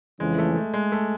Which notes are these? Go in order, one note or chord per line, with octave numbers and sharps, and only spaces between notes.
F2 C#3 E3 G#3
A3
A3
G#3
A3